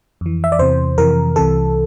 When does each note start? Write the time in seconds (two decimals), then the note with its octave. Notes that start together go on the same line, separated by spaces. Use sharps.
0.21 F2 E3
0.44 E5
0.52 D5
0.59 E2 C3 E3 C5
0.98 F2 C3 E3 A#4
1.36 C2 C3 E3 A4